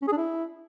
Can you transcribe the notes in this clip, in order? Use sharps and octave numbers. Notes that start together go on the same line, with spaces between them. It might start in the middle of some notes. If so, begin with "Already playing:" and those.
C#4
G#4
D4
E4